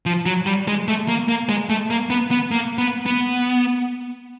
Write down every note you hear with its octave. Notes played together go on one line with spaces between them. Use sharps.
F3
F#3
G3
G#3
A3
A#3
A#3
G#3
A3
A#3
B3
B3
A#3
B3
B3